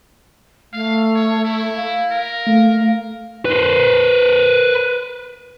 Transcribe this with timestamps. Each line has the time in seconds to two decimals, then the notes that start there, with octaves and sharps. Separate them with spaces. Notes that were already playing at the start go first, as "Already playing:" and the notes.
0.73 A3 F5
1.15 C#5
1.45 E4
1.76 F5
2.11 A#4
2.47 A3 F5
3.45 B4 C5